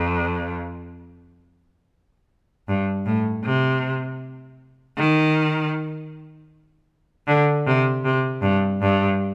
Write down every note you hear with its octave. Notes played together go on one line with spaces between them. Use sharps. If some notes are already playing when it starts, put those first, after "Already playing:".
Already playing: F2
G2
A2
C3
D#3
D3
C3
C3
G2
G2